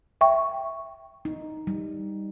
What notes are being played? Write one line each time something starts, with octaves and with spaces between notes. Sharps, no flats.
E5 G5 C#6
D#4
G3